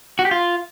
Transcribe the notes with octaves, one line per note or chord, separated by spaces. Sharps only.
F#4
G4
F4